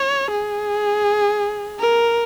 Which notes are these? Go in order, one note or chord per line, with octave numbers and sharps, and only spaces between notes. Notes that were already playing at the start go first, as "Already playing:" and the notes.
Already playing: C#5
G#4
A#4